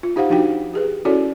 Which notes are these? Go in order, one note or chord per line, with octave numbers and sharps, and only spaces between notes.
F4
D#4 G4 C5 F5 F#5
F3 D4 D#4 F#4 G5
G4 G#4 B4
C#4 E4 F#4 A4 C#5 D5